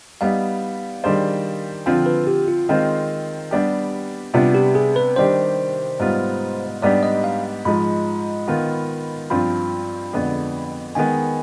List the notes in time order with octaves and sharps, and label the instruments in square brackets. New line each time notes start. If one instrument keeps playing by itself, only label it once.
[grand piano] G3 B3 D#4 [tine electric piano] F5
[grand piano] D#3 G3 D4 G#4 C5
[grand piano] D3 F3 C4 F4 [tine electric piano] G5
[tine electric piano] B4
G4
F4
[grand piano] D#3 G#3 C4 F4 C5
G3 B3 D4 G4
[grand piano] C3 G3 B3 D4 [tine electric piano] F4
[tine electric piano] G4
G#4
B4
[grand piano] D#3 G3 D4 G4 [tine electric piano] C5
[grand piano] G#2 G3 B3 F4
[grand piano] G#2 G3 B3 D4 G4 [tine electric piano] D5
[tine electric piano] D#5
F5
[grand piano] G#2 F3 G#3 [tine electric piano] B5
[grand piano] D#3 B3 F4
[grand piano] G2 F3 C4 F4 [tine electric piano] B5
[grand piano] F2 D3 G#3 B3 D4
[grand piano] D#3 G#3 B3 [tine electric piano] G#5